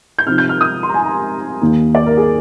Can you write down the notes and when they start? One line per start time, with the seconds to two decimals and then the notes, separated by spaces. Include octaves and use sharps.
0.19 G6
0.27 C3 F3 C4 D#4 F6
0.38 G6
0.49 F6
0.61 D#6
0.83 C6
0.89 A#5
0.94 G#5
1.05 A#5
1.62 D#2 D#3 A#3
1.95 D5
2.06 A#4
2.17 G#4